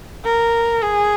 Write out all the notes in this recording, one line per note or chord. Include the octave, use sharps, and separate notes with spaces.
A#4
G#4